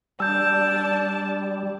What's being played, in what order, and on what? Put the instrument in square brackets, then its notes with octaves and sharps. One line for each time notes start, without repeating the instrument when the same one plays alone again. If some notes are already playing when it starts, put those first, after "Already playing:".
[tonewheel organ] G3 [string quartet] D4 A5 [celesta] E6 G6